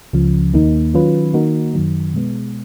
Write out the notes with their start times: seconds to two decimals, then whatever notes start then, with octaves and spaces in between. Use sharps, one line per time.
0.13 C#2 C#3 F3
0.54 D#2 D#3 A#3 D#4
0.94 D#3 F#3 C#4 F4 B4
1.34 D#3 A#3 D#4 F#4 A#4
1.74 F#2 D#3 F#3
2.14 B2 G#3 B3